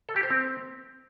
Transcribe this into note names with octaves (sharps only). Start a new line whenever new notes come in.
A4
G4
C5
C4